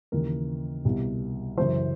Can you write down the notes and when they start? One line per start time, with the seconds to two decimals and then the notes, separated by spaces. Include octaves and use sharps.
0.12 D#2 C#3 E3 A#4
0.85 C2 B2
1.57 F#2 C#3 E3 C5